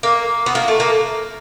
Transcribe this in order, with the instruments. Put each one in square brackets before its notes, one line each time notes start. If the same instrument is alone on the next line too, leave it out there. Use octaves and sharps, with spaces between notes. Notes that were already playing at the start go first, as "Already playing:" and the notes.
[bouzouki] A#3
B3
A#3
A3
A#3